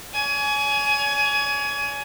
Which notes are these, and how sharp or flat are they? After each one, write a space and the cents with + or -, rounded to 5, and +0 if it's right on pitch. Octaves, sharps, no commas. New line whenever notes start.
C#5 +45 G#5 +20